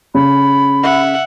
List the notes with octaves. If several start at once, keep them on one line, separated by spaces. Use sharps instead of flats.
C#3 B5
E5 F#5